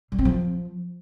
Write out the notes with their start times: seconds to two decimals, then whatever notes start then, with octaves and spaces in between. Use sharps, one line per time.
0.12 G3
0.19 C4
0.25 F3